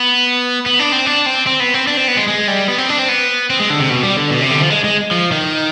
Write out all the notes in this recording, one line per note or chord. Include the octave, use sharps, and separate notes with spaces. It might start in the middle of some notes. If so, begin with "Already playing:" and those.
Already playing: B3
B3
D4
C4
D4
C4
C4
B3
C4
D4
C4
B3
G#3
G#3
G3
B3
C4
D4
C4
B3
C4
G#3
D3
C3
B2
G3
D3
B2
C3
D3
G3
F3
G#3
G#3
F3
D#3